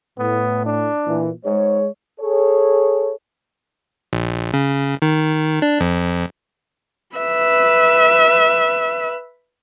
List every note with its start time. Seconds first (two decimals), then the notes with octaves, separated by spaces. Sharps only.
0.18 A2 B3
0.66 D4
1.07 A#2 E3
1.45 G#2 G#3 C#5
2.20 G#4 A4 C#5
4.13 A#1
4.53 C#3
5.02 D#3
5.62 D4
5.80 F2
7.16 B4 E5